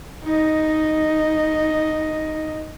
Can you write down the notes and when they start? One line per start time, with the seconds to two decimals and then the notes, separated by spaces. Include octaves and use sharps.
0.24 D#4 D#5